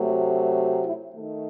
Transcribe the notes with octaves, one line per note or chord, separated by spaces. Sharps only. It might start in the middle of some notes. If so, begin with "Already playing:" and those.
Already playing: C3 F#3 A3
E4
D#3 A3